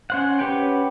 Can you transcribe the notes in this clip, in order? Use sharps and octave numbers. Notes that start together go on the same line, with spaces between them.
C#4 C5 F#5
C#4 G4 B4 F#5 G5